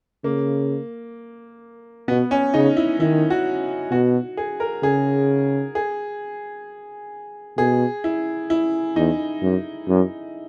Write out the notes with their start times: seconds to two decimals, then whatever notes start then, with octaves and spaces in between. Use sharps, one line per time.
0.24 C#3 A#3
2.08 B2 B3
2.31 C#4
2.54 C#3 D#4
2.77 E4
3.00 D#3 E4
3.30 F#4
3.91 B2 F#4
4.37 G#4
4.60 A#4
4.83 C#3 G#4
5.75 G#4
7.58 B2 G#4
8.04 E4
8.50 E4
8.96 E2 D#4
9.42 F#2
9.88 F#2